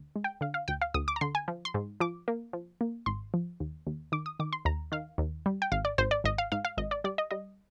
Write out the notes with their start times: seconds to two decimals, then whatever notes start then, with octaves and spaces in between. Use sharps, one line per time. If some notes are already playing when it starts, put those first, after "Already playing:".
Already playing: D2
0.16 G#3
0.24 G5
0.41 D3 F5
0.54 F5
0.68 D2 G5
0.82 F5
0.94 D2 D#6
1.08 D6
1.16 A#5
1.21 D3 C6
1.35 G#5
1.48 F3
1.65 C6
1.74 G#2
2.00 F3 D6
2.28 A#3
2.53 F3
2.81 A#3
3.06 G#1 C6
3.34 F3
3.60 D#2
3.87 D#2
4.12 D#3 D6
4.26 D#6
4.40 D#3 D6
4.53 C6
4.65 D#2 A#5
4.92 D#3 F5
5.18 D#2
5.46 G3
5.62 G5
5.72 G#1 F5
5.85 D5
5.98 G#1 C5
6.11 D5
6.24 G#1 D#5
6.38 F5
6.52 G#2 F5
6.65 F5
6.78 G#1 D#5
6.91 D5
7.04 G3 D5
7.18 D#5
7.31 G3 D#5